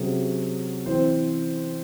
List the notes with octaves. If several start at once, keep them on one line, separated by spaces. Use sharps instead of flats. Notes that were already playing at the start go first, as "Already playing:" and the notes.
Already playing: C3 F#3 C#4 G#4
E3 C4 C5